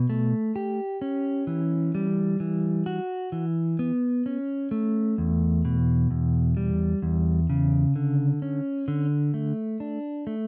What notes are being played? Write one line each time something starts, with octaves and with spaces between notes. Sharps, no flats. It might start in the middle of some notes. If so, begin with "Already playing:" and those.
Already playing: B2
A3
G4
C#4
E3
G3
E3
F#4
E3
B3
C#4
A3
E2
B2
E2
G3
E2
C#3
D3
C#4
D3
A3
D4
A3